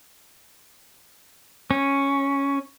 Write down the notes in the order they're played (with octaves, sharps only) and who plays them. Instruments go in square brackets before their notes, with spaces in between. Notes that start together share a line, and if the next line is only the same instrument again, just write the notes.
[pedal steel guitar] C#4